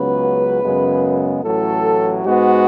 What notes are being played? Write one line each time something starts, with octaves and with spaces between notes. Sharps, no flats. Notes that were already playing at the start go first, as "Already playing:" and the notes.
Already playing: C#2 C#3 F#3 B3 B4
F#2 C#3 G#3 B3
A1 A2 F#3 A4
G#2 G#3 B3 F#4